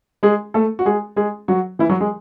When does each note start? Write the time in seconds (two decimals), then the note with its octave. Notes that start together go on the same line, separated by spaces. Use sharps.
0.23 G#3 G#4
0.54 A3 A4
0.79 F#4
0.85 G#3 G#4
1.16 G#3 G#4
1.48 F#3 F#4
1.79 E3 E4
1.89 F#3 F#4
2.00 G#3 G#4